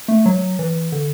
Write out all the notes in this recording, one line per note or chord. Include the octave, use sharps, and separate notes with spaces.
A3
F#3
E3
D3